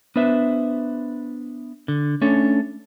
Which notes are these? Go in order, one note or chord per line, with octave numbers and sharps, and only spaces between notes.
B3 D4 B4 C5 E5
D3
A3 C#4 D4 A4 C#5